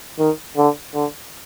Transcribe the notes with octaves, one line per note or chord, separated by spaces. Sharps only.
D#3
D3
D3